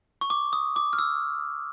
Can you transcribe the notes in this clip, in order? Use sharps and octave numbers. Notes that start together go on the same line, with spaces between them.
C#6
D6
D#6
D6
F6
E6